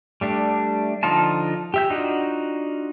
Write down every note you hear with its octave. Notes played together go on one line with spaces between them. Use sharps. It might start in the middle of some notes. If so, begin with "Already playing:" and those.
G3 A3 D4
D3 F3 D#4 F4 A5
G4 E5 G6
D4 D#4 F4 F#4 D#5